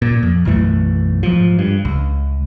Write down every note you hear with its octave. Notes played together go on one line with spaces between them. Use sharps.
A#2
F2
B1 F#2 E3 A3
G#2 F3
G2
C#2